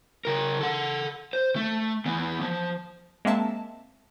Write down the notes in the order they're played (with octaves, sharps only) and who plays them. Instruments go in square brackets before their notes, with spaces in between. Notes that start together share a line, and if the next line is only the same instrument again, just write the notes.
[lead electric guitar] C#3 A#4
A4 F#5
C5
A3
E3 B3
F3
[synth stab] G#3 A#3 C4 E5 A5